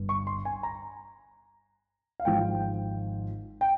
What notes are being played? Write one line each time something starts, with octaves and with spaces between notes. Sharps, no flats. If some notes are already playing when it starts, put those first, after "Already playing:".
Already playing: G1 G2
C#6
C6
G#5
A#5
F5
G#1 G#2 F3 G5
G5